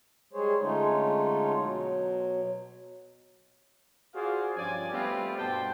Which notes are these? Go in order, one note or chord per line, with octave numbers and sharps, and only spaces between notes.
G3 G#3 G#4 C5 C#5
D3 G#3 A3 C#4 D#4 F4
B2 F#3
F4 F#4 G#4 C5 D5 F5
G2 F3 C#4 D5 G#5
G3 A3 B3 C4 F4 G4
G2 B2 G4 C5 G5 A5